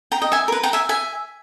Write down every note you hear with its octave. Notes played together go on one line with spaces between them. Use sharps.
G5 A#5
D#5 G5
E5 G#5
A#4
B4
G5 A#5
E5 G#5
E5 G#5